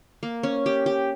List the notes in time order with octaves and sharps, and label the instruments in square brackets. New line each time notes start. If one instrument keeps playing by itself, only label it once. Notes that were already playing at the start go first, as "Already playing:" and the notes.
[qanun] A#3
C#4
G4
G4